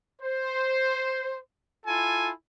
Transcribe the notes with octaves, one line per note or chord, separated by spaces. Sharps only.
C5
E4 F4 A4 G#5